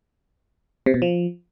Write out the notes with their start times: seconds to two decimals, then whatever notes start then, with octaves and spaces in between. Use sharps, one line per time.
0.86 C3
0.94 B2
1.02 F3